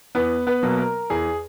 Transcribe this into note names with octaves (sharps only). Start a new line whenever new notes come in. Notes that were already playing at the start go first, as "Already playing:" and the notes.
E2 B3 B4
B3 B4
B2 F#3 A#3
A#4
E2 G#4